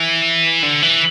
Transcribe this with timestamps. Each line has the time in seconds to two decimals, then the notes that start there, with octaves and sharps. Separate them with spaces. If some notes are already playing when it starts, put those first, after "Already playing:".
Already playing: E3
0.63 D3
0.82 E3